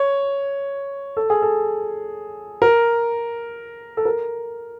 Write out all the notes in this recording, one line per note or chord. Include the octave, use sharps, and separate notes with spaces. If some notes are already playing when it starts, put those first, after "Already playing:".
Already playing: C#5
A4
G#4
A4
A#4
A4
A#4